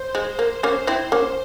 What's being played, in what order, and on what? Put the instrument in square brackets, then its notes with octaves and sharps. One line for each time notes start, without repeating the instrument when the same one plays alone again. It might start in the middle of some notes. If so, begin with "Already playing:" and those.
Already playing: [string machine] C5
[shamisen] G#3
A#3
A#3 C#4
C4 E4
A#3 C#4